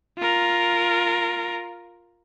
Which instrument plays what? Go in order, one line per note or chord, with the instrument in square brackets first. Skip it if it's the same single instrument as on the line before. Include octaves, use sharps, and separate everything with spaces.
[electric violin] F4 A#4